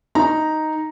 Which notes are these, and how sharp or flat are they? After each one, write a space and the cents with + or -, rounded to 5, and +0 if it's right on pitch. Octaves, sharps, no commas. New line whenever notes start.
D#4 +0 A#5 +0